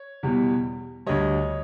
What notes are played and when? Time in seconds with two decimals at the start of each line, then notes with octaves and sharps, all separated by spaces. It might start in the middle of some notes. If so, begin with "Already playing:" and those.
Already playing: C#5
0.23 E2 B2 G3
1.06 D2 D3 G3 C#5 D#5